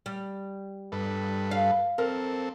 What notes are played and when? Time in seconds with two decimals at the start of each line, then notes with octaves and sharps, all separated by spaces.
0.06 G3
0.92 G2 A4 B4
1.51 F5
1.98 C4 A4 A#4